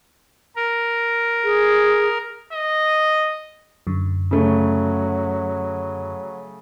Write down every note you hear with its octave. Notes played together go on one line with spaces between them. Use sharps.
A#4
G#4
D#5
F#2 D3
C#3 F#3 A3